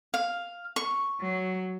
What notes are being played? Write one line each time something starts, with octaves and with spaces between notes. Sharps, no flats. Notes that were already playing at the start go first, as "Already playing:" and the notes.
F5
C#6
F#3